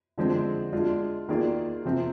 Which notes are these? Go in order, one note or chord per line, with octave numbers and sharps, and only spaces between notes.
D3 F3 G#3 C4
G#3 D4 F4
D#3 A#3 F4 G#4 D5
C3 F3 C4